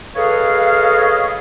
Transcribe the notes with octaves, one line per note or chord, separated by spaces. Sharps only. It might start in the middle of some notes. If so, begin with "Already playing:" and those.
G#4 A4 B4 C#5 D#5 F5